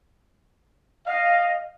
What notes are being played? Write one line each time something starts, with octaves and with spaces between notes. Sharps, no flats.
D#5 F5